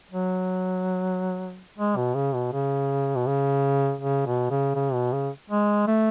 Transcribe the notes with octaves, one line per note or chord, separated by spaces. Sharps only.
F#3
G#3
B2
C#3
B2
C#3
B2
C#3
C#3
B2
C#3
C#3
B2
C#3
G#3
A3